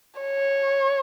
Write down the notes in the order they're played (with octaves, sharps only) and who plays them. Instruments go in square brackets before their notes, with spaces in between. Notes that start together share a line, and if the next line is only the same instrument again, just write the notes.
[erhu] C#5